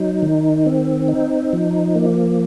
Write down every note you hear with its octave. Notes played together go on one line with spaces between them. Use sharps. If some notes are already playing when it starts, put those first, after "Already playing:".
Already playing: F#3 D#4
D#3
C4
D#4
F3
A#3